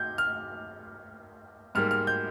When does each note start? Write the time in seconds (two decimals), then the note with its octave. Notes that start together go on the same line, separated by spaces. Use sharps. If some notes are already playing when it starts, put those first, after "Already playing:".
Already playing: G6
0.18 F6
1.75 G#2 G3 A#3 F6
1.91 F6
2.07 G6